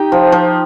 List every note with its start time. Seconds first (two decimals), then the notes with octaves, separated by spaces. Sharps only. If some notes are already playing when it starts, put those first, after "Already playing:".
Already playing: D#4 G4 G5
0.12 F3
0.32 F3